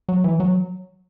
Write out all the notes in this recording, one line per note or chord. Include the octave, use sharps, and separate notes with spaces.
F#3
E3
F#3